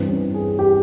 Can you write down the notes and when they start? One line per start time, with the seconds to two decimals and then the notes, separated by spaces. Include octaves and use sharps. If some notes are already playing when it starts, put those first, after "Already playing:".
Already playing: G2 E3 C4
0.09 C#4
0.34 G#4
0.59 G4